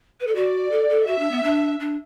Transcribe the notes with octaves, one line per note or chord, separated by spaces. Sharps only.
B4
A4
F#4 D5
A4
A4
F#4 E5
D4
B3
D4
D4